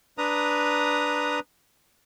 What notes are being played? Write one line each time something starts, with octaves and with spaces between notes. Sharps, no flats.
D4 B4 A#5 D#6